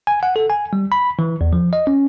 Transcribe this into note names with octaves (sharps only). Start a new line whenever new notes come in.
G#5
F#5
A4
G#5
G3
B5
E3
E2
F3
D#5
C#4